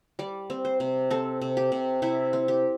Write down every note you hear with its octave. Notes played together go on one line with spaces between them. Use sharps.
G3 D5
C4
C5
C3
C4 A4
C3
G4
C3
C3 E4
C4
G4